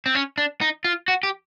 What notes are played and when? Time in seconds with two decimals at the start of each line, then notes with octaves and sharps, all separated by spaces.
0.06 C4
0.15 C#4
0.38 D4
0.61 D#4
0.84 F4
1.08 F#4
1.23 G4